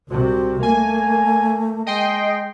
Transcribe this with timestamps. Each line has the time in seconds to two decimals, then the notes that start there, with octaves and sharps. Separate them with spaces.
0.10 C2 C3 F#4
0.63 A3 A#3 G#5
1.86 G#3 D#5 G5 C6